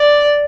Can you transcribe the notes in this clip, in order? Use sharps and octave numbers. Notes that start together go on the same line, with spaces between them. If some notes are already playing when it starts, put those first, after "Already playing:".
Already playing: D5